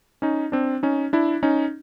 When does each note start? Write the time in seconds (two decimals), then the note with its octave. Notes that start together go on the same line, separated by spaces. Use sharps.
0.22 C#4 D#4
0.52 C4 D4
0.83 C#4 D#4
1.13 D4 E4
1.43 C#4 D#4